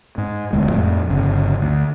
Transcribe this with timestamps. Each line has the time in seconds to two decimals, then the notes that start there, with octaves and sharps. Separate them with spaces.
0.18 G#2
0.53 E1 D2 G#3
0.69 F2 A2
1.09 G1 C#3
1.62 D2